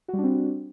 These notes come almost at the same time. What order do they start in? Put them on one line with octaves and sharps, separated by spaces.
F#4 G3 D4 C4